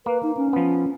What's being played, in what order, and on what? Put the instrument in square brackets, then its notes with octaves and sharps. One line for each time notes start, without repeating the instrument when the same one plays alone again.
[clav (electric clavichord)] A#3 [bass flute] B4
[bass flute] D#4
C#4
[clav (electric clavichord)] F3 B3